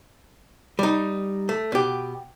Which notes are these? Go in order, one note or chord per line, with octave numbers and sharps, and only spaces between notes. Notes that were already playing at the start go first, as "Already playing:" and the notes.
G3 D#4
A3
B2 G4